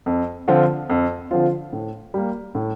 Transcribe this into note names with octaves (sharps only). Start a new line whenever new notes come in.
F2
D3 F3 C4 F4
F2
D3 F3 C4 F4
A2
G3 A#3
A2